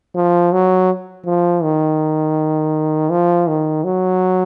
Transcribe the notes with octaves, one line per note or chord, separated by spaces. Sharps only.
F3
F#3
F3
D#3
F3
D#3
F#3